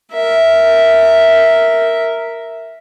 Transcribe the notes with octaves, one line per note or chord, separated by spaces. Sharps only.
A#4 E5